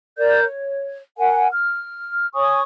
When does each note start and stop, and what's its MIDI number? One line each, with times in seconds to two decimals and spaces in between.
0.17 0.43 70
0.17 0.43 74
0.17 0.43 91
0.44 0.99 73
1.17 1.47 70
1.17 1.47 78
1.17 1.47 80
1.52 2.27 89
2.35 2.62 73
2.35 2.62 80
2.35 2.62 85
2.35 2.62 87